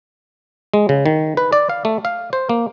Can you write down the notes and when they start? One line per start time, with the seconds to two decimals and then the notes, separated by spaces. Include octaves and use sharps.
0.74 G#3
0.89 C#3
1.06 D#3
1.37 B4
1.52 D5
1.70 F5
1.85 A3
2.05 F5
2.33 C5
2.49 A#3